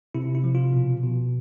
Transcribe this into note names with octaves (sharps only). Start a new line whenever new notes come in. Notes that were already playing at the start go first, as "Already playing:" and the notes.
C3 E4
E4
F3
F4
B2
B2